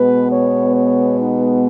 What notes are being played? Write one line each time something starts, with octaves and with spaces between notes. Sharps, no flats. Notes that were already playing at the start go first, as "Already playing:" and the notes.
Already playing: B2 G#3 B3 B4
C#5
C#5
D#4